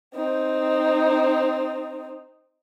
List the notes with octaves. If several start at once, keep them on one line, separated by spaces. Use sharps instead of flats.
C4 D#4